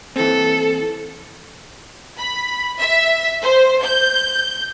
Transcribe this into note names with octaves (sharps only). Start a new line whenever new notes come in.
E3 C4 A4
B5
E5
C5
G6